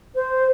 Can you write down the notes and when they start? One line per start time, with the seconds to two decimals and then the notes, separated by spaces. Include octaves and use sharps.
0.15 C5